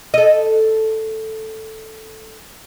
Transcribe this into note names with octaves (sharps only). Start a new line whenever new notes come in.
A4 D#5